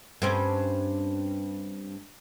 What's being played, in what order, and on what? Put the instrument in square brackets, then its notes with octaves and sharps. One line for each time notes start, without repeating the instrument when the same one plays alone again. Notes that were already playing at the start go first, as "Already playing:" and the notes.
[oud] G2 C4 C#4